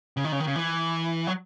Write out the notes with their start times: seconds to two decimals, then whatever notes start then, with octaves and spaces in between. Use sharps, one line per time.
0.17 C#3
0.25 D#3
0.32 C#3
0.40 D#3
0.47 C#3
0.56 E3
1.27 F#3